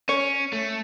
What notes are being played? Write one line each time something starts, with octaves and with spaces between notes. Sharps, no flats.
C#4 C#5
A3